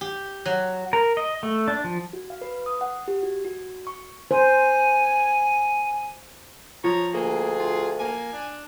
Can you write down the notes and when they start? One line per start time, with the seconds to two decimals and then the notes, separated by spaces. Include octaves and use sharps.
0.01 G4
0.45 F#3
0.93 A#4
1.17 D#5
1.43 A3
1.68 D4
1.84 F3
2.13 F#4
2.30 F5
2.41 B4
2.66 D#6
2.81 F#5
3.08 G4
3.23 F#4
3.45 F#4
3.87 C#6
4.31 C5 G#5
6.84 F3 C#5 A#5
7.13 D2 A#3 G#4
7.60 F4
7.99 A#3 G#5
8.33 D4